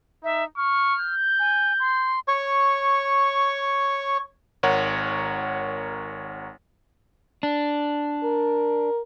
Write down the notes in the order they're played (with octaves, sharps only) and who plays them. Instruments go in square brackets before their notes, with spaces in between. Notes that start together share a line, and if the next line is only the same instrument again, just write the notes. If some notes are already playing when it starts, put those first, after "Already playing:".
[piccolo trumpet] D#4 [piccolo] E5
[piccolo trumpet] C#6 [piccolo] F6
[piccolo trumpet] G6
[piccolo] G#5
C6
[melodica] C#5 C#6
[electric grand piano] G#1 A#4 C#5 F#5
[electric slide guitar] D4
[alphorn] A#4